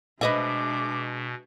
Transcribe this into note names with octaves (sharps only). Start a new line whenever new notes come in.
B2 G#3 D4 B4 D#5 E5 D6